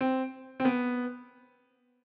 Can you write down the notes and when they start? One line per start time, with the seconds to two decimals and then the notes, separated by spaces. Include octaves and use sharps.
0.01 C4
0.60 C4
0.65 B3